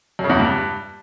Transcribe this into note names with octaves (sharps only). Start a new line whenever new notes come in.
F#2
C#3
E2
A#2
G2